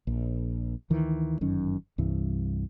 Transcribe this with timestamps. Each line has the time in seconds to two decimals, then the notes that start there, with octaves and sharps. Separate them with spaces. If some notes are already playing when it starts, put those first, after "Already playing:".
0.07 A#1
0.90 D2 D#3 E3
1.41 G1 F#2 D#3 C#4
1.98 C2 G2 E3